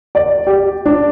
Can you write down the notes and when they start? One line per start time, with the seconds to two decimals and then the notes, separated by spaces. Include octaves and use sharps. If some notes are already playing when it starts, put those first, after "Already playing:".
0.15 D5
0.47 G4
0.86 D4